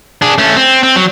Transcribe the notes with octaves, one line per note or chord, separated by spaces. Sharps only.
D4 G#4
A3 C#4
C4
C4
F#3